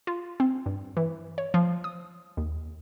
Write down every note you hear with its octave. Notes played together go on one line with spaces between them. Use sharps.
F4
C4
G2
E3
C#5
F3
D#6
D#2